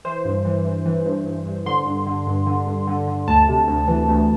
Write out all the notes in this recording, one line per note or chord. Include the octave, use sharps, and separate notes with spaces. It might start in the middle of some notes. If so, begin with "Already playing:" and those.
E3 C5
G2
E3
E3
E3
G2
G2
G2
D3 C6
G2
D3
G2
D3
G2
D3
D3
D2 A5
C3
D2
E3
D2